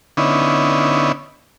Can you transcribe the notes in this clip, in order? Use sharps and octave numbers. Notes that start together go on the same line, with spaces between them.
D3 B3 C#4 D#4 E4